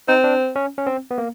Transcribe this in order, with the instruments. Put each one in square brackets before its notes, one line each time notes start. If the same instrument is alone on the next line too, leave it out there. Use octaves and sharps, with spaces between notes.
[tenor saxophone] C4 [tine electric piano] D#4
[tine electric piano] D4
C#4
C#4
C4
B3
A#3